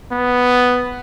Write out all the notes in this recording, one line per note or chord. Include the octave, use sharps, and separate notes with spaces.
B3